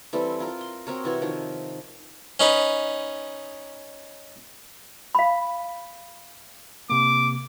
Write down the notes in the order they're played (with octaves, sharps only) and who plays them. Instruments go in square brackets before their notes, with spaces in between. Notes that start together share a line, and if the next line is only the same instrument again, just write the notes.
[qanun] E3 G3 C4 A4
F4 A#4
C6
C4 F#4 A#4 C#5
C3 E3 F#4 C#5
D#3 F3
[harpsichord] C#4 D#4 B4
[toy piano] F5 B5
[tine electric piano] C3 A#3 [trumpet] D6